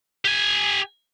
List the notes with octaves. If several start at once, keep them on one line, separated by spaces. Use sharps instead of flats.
G4 G#5